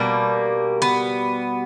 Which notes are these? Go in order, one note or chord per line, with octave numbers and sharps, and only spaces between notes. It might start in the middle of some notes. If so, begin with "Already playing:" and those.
Already playing: B2 G3 A#3
B3